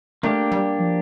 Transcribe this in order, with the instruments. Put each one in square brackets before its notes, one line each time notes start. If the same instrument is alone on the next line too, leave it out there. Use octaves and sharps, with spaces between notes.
[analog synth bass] A3 [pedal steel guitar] A#3 D4 G4
[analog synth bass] G3
F3